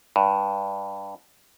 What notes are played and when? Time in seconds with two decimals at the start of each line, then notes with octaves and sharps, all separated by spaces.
0.16 G2